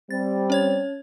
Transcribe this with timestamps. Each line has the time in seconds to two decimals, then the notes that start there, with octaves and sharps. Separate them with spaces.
0.11 G3 C4 A6
0.50 C#4 C#5 G#6